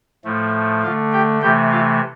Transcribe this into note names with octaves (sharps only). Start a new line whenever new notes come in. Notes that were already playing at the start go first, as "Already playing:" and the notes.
A2 F3 A3
D3 A3 F4 F5
G4 G5
C3 E3 A3 G4 G5
F4 F5